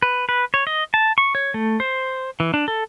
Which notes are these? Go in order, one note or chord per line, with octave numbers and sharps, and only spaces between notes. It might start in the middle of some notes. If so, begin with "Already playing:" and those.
B4
B4
C#5
D#5
A5
C#6
C#5
A3
C5
E3
D4
A4